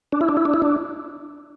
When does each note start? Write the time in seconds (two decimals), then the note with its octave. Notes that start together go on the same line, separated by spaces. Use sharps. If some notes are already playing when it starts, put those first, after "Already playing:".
0.12 D4
0.21 E4
0.29 D4
0.37 E4
0.45 D4
0.54 E4
0.62 D4